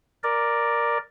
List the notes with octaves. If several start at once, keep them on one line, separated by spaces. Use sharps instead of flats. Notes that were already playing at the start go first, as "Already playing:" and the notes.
A#4 D5